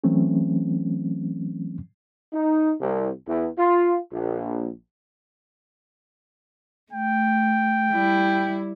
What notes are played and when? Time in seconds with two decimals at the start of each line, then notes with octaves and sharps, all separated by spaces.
0.04 E3 F#3 A3 C4 C#4
2.32 D#4
2.81 C2
3.27 E2
3.58 F4
4.11 A#1
6.93 A3 G5
7.92 G3 E4